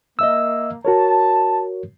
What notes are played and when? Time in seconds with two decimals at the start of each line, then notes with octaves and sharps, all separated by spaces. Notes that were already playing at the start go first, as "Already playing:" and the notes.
0.19 A#3 D#5 E5 E6
0.85 F#4 A#4 C#5 A5